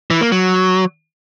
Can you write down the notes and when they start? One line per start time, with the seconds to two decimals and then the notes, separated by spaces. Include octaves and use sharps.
0.11 E3
0.21 A#3
0.32 F#3